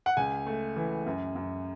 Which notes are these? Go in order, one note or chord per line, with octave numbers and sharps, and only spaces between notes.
F#5
C#2 G#5
A3
E3
F#2
F#2